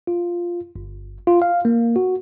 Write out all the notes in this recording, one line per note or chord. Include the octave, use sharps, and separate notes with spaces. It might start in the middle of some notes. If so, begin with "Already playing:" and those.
F4
G1
F4
F5
A#3
F#4